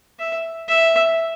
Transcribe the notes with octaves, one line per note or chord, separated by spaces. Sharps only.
E5
E5